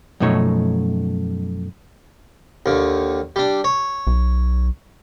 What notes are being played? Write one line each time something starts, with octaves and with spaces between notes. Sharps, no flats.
F#2 B2 F3 A3 D#4 C#5
D#2 D3
G3 D4
C#5
B1